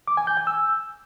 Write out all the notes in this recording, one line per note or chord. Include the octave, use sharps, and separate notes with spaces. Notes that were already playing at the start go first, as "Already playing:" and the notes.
D6
G#5
G6
G#5
E6